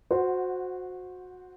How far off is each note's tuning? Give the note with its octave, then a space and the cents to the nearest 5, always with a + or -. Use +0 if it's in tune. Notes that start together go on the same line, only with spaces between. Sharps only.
F#4 -20 C5 -5 F#5 +0